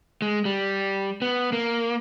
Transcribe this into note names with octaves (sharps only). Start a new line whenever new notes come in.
G#3
G3
B3
A#3